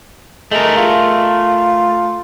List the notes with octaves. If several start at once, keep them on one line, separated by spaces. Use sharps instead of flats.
G#3 A3 A#4
F4